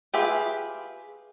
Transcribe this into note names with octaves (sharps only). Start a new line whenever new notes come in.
F4 G4 G#4 B4 E5